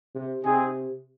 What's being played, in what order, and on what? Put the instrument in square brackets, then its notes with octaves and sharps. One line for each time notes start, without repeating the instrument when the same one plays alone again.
[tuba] C3
[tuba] C3 [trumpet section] C4 D#4 G#4